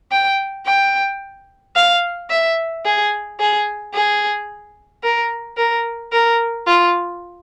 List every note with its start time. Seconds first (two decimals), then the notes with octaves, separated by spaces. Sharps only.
0.12 G5
0.66 G5
1.75 F5
2.30 E5
2.85 G#4
3.40 G#4
3.94 G#4
5.03 A#4
5.57 A#4
6.12 A#4
6.67 F4